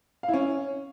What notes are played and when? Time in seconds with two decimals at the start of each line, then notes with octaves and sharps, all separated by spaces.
0.23 F5
0.28 E4
0.34 C#4